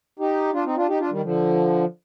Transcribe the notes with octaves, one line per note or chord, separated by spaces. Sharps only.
D#4 G4
D4 F4
C4 D#4
D4 F4
D#4 G4
D4 F4
D#3 G3
D3 F3